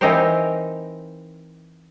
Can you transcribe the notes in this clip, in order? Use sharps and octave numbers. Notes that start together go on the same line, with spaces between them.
E3 C4 D#4 G4 A#4 C5